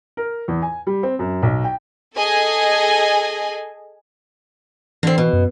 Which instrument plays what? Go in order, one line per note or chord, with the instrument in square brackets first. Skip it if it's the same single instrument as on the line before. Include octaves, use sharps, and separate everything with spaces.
[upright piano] A#4
E2
G#5
G3
C4
F#2
B1
G5
[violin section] G#4 A4 D#5 G#5
[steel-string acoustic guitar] D3 C4 [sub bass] E3
[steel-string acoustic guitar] B2
[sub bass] F#2